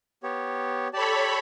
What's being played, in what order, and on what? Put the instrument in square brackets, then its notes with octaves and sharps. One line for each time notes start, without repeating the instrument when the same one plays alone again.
[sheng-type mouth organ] B3 G4 C#5
[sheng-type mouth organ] G4 D5 A5 [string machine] A4 C#5 B5